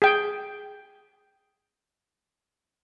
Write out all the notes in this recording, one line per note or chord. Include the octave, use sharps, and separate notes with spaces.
G#4 G5